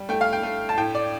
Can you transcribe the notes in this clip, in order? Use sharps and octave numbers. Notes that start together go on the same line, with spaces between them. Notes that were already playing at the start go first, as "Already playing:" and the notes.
Already playing: G3
A3 G5
F5
G5
A3
A5
A2 G5
D5